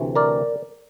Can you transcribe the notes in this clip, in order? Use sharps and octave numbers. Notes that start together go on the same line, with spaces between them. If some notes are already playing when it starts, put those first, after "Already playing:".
Already playing: D2 C3 E3
A#4 D5